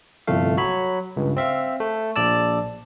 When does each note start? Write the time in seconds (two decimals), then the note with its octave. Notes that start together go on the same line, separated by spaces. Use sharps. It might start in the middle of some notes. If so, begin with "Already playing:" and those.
0.27 G1 C2 F2 A3 F5
0.57 F#3 C#5 B5
1.16 C#2 G2
1.37 C4 E5 F5
1.80 A3
2.16 A#1 D5 A5 E6